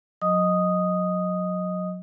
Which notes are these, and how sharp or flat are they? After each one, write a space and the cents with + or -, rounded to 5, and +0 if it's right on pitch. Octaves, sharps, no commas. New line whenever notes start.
F#3 -30 D#5 +0 D#6 +0